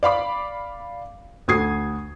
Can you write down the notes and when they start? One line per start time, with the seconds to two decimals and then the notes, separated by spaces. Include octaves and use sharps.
0.03 D5 F5 B5 D6
1.48 D2 F#4 D#6 G#6 C7